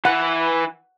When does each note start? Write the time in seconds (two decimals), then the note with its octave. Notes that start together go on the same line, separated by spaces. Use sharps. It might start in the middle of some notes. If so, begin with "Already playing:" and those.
0.05 E3 B4 F#5